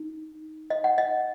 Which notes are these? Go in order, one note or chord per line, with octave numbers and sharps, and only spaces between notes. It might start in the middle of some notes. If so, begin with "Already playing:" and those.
Already playing: D#4
D#5
F#5
D#5